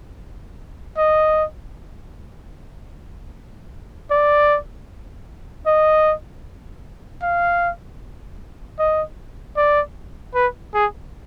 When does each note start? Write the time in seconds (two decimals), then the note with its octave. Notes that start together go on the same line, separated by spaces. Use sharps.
0.97 D#5
4.11 D5
5.66 D#5
7.23 F5
8.79 D#5
9.57 D5
10.35 B4
10.74 G#4